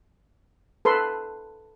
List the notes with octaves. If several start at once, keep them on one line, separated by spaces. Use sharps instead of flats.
A4 B4 C6